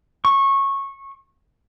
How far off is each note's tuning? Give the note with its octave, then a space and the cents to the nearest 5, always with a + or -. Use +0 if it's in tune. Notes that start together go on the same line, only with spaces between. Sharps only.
C#6 -20